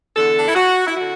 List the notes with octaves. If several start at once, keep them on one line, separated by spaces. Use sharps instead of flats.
E2 D3 A4
D4
E4
F#4
E4
D3 F#4